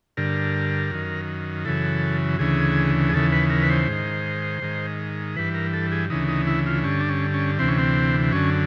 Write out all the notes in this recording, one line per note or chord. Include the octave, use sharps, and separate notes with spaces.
G2 D3 A#4
F#2 D#3
F#2 C#3 E3 A4
D2 C#3 E3 G#4
G#4
D#2 C#3 E3 A4
B4
A#4
B4
C5
G#2 D#3
G#2 D#3
G2 E3 B4
A#4
A4
G#4
D2 C#3 E3 D#4
D#4
E4
F4
G2 D3 C#4
D4
C#4
C#4
D2 C3 E3 C4
C#4
C4
F#2 D3 C#4